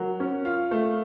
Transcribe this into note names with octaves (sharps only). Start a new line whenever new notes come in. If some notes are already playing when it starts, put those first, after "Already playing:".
Already playing: F#3 A#4
C#4
F4
A3